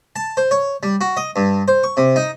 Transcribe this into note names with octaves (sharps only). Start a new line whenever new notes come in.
A5
C5
C#5
G3
F#4
D#5
G2
C5
C#6
C3
D#4